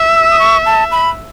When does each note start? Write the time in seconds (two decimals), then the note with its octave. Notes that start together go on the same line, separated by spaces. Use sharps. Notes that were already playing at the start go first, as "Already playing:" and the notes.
Already playing: E5
0.14 E6
0.30 D#6
0.39 C#6
0.66 A5
0.92 B5